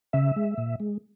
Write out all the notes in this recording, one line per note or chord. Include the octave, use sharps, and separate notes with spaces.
C#3 E5
G#3
A#2
G#3